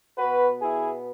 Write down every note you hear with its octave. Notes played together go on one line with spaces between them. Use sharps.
B2 B3 F#4 B4
E4 G#4